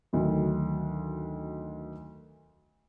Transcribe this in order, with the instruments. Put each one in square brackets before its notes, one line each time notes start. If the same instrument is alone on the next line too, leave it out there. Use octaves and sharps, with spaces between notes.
[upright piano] D2 D#3 F#3